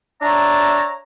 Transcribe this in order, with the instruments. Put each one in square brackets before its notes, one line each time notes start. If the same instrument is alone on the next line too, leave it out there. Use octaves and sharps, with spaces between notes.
[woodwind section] D4 C#5 E5 A5 A#5